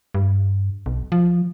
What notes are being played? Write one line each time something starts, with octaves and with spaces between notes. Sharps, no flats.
G2
B1
F3